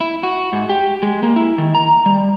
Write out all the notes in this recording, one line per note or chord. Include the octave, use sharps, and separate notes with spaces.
E4
F#4
G#2
G4
G#3
A#3
E4
D#3
A#5
G3